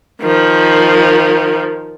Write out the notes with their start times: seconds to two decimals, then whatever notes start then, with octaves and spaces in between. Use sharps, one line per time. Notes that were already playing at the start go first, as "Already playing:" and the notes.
0.21 D#3 F3